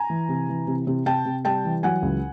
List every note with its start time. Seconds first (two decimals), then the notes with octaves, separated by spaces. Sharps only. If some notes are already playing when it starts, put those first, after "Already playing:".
Already playing: G#5 A#5
0.10 E3
0.29 C3
0.49 E3
0.67 C3
0.87 C3
1.06 C3 G5 A5
1.25 C3
1.45 G3 G5 A5
1.65 E3
1.83 F#3 F#5 G#5
2.02 C#2